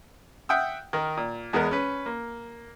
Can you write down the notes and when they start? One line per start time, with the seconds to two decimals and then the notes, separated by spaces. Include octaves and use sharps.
0.49 E5 F#5 G5 D#6 E6
0.93 D#3 A#4
1.17 A#2
1.53 E2 G#3 B3 A#4
1.71 C#4 B4
2.06 A#3